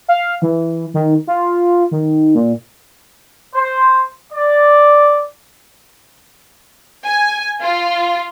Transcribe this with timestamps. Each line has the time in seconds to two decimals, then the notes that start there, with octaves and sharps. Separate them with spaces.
0.09 F5
0.42 E3
0.94 D#3
1.27 F4
1.91 D#3
2.35 A#2
3.54 C5
4.31 D5
7.05 G#5
7.61 F4